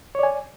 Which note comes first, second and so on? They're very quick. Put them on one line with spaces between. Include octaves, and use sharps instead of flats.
C#5 D5 G#5